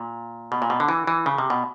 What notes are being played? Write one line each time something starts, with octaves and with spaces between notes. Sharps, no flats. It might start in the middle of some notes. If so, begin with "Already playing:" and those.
Already playing: A#2
B2
A#2
B2
D3
E3
E3
C#3
C3
B2